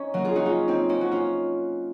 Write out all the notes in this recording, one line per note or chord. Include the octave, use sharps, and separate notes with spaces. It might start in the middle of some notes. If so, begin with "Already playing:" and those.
Already playing: C#4 D#4
F#3 A#3
F4 G#4
D#4 F#4
C#4 F4
C4 D#4
A#3 C#4
F#4
C#4 F4